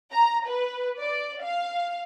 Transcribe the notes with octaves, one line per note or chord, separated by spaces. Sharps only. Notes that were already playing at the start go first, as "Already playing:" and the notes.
A#5
B4
D5
F5